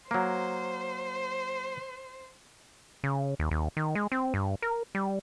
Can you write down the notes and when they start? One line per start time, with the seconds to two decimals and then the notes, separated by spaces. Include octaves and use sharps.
0.11 F#3 A#3 C5
3.04 C#3
3.39 D#2
3.51 D#2
3.77 D#3
3.95 G#3
4.12 C4
4.34 G2
4.62 A#4
4.95 G3